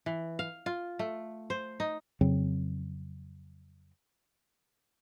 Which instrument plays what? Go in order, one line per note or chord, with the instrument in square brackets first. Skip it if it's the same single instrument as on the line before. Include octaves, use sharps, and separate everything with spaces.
[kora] E3
F5
F4
A3
C5
D#4
[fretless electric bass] F2 C#3 F#3 C4